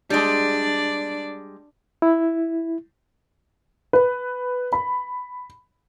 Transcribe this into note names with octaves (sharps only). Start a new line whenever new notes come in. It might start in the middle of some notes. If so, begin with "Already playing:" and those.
G3 G#3 D4 D5
E4
B4
B5